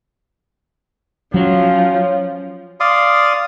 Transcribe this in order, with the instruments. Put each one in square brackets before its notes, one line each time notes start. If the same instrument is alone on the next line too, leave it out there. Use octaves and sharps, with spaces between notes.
[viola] F3 [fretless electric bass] F#3 [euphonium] C#4
[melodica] D5 F5 C6 D#6